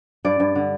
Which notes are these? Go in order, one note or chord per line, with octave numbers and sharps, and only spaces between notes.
G2 D5
G2
D3